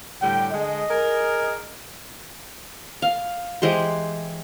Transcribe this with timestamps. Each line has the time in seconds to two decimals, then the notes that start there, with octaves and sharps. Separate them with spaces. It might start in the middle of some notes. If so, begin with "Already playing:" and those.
0.22 A2 D3 G3 G5
0.52 D3 G#3 D#5
0.90 G#4 A#4
3.02 F5
3.62 E3 G#3 G4 C5